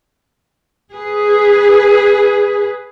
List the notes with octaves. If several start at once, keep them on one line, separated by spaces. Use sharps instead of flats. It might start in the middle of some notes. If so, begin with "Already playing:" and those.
G#4 B4